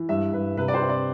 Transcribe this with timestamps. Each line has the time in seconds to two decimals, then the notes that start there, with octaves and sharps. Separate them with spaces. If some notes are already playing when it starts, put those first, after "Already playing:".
Already playing: E3
0.09 G2 E5
0.32 G2 B4
0.57 C3 B4
0.68 D5
0.74 C5
0.82 C4
0.89 D5